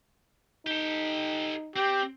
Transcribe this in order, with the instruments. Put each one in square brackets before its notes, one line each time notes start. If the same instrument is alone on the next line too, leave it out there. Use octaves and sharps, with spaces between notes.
[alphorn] D#4 [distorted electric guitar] G4 A4
[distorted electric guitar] C4 [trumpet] G4